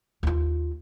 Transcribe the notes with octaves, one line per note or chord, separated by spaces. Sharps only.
D#2 F4